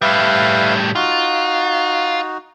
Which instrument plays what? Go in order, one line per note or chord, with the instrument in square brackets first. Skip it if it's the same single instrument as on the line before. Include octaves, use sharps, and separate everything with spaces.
[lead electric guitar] A2 G3 [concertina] B4 E5 F5
[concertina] D#4 F#4 [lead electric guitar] F4